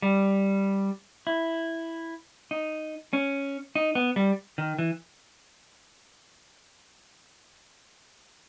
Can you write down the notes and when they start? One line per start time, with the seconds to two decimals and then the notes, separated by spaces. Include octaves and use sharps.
0.02 G3
1.27 E4
2.51 D#4
3.13 C#4
3.75 D#4
3.95 B3
4.16 G3
4.58 D#3
4.78 E3